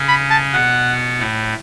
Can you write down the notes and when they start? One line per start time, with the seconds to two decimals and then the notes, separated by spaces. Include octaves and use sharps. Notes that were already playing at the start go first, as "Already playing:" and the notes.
Already playing: C#3 C#4
0.08 B5
0.30 A5
0.53 B2 B3 F#5
1.19 A2 A3